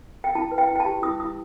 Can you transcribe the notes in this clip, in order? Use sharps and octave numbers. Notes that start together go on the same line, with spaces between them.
G5
E4 A5
B4
G5
E4
G5
A5
G4
E4 D#6
E4 D#6